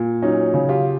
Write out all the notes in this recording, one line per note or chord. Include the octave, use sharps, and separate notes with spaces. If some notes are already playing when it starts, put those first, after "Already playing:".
Already playing: A#2
F#3 C#4 D#4
C#3
F4 G4